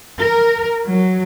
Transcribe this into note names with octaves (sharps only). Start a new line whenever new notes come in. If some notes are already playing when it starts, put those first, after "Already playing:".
A#4
F#3